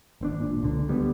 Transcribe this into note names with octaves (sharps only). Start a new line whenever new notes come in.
G#1 C4 D4
A#2
C#2 D3
D2 G3 B3